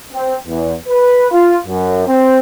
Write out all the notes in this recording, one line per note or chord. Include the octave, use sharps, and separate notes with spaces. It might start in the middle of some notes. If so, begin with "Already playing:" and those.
C4
E2
B4
F4
F#2
C4